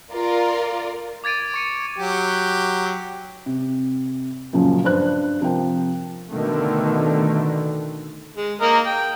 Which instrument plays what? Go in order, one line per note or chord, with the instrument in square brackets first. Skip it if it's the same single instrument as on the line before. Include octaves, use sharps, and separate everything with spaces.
[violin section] F4 A#4 D5
[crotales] D6 G#6 A6 D7 D#7
C#6 C#7 D#7
[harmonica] F#3 G4
[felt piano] C3
F#2 A#2 C#3 F3 F#3
G2 C5 F#6
C3 F3 A#4 G5
[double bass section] B2 D3 D#3 A3
[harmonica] G#3
A#3 A#4 D#5
G5